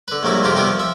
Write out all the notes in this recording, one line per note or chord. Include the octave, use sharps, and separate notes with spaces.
D3 B4
A#1 D#3 F#3 G3 E4
F2 C3 G#3 A#3 F4 G4
C3 D#3 G3 B3 E4 G4
F3
F3 E5